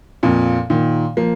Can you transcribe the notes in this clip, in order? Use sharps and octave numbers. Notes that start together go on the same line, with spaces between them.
F2 A#2
A#2 D#3
F3 A#3